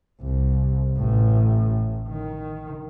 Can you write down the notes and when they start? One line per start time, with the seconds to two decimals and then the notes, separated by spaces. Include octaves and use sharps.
0.21 C2
0.98 A1 A2
2.09 D#3